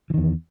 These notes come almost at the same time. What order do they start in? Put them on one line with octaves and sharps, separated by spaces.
E3 D#3 E2